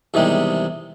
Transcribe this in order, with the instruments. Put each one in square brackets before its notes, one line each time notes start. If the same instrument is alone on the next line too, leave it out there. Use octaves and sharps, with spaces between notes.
[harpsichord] E2 C3 D#3 G3 G#3